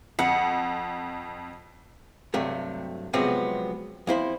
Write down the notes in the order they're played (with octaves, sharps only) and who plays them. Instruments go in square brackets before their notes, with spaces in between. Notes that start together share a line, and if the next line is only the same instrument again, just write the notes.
[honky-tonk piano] F2 [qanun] F#5
[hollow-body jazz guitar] G2 C3 F#3 A3
C3 F3 F#3 G#3 B3 C4
F2 E4 C5 B5